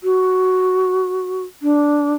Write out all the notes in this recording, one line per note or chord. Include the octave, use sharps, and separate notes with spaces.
F#4
D4